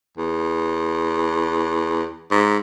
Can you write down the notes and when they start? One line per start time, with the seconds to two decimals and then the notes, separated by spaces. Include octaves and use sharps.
0.17 E2
2.31 G#2